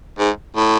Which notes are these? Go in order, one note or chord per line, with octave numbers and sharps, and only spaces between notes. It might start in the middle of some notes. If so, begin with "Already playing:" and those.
G#2
A2